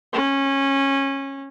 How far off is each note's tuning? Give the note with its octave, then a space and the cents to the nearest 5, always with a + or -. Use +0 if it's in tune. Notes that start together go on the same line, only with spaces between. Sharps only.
C#4 -20